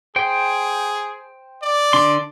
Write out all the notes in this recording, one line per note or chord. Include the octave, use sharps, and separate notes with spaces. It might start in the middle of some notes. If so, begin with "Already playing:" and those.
G#4 C5 G5
D5
D3 D4 C6